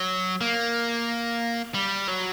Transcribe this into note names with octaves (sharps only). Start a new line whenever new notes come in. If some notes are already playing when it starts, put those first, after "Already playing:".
Already playing: F#3
A#3
G3
F#3